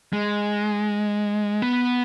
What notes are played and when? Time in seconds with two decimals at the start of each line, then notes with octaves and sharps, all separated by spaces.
0.13 G#3
1.62 B3